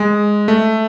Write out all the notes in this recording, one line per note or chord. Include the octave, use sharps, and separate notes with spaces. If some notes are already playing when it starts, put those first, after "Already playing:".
Already playing: G#3
A3